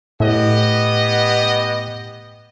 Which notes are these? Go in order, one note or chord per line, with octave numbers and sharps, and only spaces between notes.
A2 B3 G4 D#5